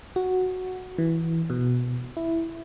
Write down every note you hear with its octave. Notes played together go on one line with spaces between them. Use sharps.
F#4
E3
B2
E4